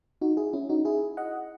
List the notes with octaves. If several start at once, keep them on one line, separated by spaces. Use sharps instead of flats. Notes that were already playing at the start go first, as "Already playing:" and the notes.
D#4 F#4
E4 G#4
C#4 E4
D#4 F#4
E4 G#4
D#5 F#5